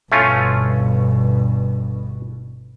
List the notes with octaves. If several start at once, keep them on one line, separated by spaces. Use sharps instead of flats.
G1 B2 A3 C#4 F4